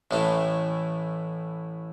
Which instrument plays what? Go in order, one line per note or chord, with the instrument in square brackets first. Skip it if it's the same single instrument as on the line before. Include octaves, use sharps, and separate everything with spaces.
[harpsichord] A1 A2 E3 A3